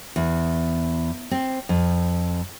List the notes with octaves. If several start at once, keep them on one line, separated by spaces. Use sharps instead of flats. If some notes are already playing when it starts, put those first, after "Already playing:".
E2
C4
F2